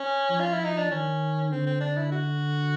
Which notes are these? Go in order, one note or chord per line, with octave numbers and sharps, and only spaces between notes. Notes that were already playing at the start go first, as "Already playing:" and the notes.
Already playing: C#4
F3
F4
E4
D#4
D4
D#3 C#4
D3 C4
C4
D4
E4
F#4